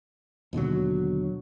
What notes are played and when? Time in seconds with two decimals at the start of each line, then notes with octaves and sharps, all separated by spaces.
0.53 D#2 B2 D3 F#3